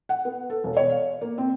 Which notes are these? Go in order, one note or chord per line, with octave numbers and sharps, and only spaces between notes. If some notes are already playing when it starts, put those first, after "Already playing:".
F#5
B3
A4
E1
C#5
F5
A#3
C4